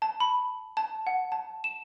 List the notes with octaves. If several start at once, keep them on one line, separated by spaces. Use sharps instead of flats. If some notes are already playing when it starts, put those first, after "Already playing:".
A5
B5
A5
F#5
A5
E7